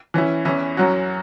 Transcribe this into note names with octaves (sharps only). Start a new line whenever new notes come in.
E3 C#4 E4
E2 E3 C#4 E4
F#2 F#3 C#4 F#4